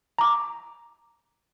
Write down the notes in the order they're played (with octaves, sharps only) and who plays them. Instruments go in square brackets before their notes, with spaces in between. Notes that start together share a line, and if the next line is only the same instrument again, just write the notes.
[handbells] A#5 D6